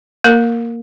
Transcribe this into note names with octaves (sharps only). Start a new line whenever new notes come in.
A#3 A#4